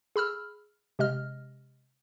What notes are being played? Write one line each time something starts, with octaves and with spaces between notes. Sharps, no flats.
G#4 B5 E6 F6
C3 G#3 D#5 F6